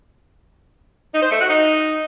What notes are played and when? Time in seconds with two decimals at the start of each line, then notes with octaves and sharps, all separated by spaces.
1.13 D#4
1.22 C5
1.31 A3
1.40 F#4
1.49 D#4